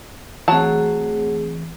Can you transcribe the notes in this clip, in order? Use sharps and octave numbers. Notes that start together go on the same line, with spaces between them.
E3 F#3 A3 C4 F#4 G#4 A5